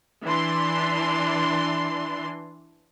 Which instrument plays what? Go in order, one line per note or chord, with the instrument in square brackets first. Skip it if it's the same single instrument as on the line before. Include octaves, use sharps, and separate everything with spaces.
[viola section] E3 D4 C6